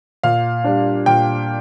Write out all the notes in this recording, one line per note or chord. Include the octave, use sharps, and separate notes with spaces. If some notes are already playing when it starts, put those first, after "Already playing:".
A#2 F5
G3 D4
A#2 G5